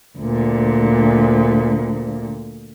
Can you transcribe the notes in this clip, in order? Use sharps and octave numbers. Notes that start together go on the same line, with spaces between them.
D2 A#2